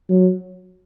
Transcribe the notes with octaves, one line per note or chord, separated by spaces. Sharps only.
F#3